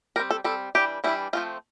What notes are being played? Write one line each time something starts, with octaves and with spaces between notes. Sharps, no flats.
G3 C4 A#4
A4
G3 C4 A4
E3 G3 D4 G4
E3 G3 D4 E4
F3 A3 C4 F4